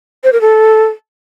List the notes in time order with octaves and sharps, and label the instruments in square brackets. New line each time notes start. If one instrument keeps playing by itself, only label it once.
[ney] C5
A#4
A4